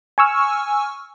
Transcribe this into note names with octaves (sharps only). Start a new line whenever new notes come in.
G#5 C#6 E6 F6